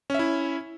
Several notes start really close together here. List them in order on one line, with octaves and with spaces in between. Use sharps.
C#4 E5 E4